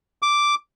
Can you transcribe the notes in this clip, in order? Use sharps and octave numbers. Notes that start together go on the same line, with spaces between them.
D6